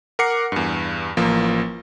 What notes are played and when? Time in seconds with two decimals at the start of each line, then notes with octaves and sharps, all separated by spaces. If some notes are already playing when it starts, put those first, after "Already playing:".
0.19 A#4 F#5 D6 C7 C#7
0.52 E2 G2
1.17 A1 F3 A#3